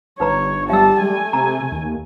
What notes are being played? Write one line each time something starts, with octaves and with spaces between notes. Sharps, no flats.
G1 D#4 B4 C#5 A#5
G3 E5 A5 E6
G3 A3 G#5
C3 A#5
D#2